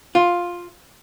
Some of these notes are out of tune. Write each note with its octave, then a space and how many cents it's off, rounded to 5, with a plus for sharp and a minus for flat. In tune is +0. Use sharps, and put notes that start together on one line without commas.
F4 +5